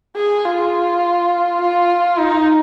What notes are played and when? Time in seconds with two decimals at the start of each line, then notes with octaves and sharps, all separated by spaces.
0.16 G#4
0.45 F4
1.60 F4
2.19 D#4